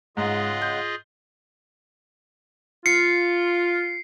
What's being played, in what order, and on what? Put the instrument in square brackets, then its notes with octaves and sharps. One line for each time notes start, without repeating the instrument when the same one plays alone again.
[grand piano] G#2 [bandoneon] C#3 G#3 F#5 [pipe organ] F4 G#4 D#5
[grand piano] G6
[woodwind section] F4 [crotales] C7 [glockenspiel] C#7